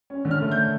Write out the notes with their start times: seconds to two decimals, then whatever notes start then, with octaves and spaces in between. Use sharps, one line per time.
0.10 C#4
0.25 D3
0.31 F6
0.41 A3
0.51 G6